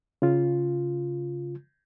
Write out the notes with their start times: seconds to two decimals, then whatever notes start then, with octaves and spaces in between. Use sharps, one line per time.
0.22 C#3 F4